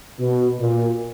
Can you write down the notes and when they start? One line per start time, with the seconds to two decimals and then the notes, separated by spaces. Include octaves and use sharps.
0.20 B2
0.61 A#2